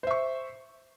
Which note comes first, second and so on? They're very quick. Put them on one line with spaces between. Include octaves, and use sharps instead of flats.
C5 E5 C#6